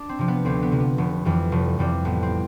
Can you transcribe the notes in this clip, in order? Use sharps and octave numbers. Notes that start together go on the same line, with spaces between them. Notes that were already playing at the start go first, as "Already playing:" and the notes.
Already playing: D4
C4
C3 F3
B3
D2 C4
B3
C3 F3
B3
F1 B3
F2 E3 G3
F1
F2 E3 G3
A1 B3
C4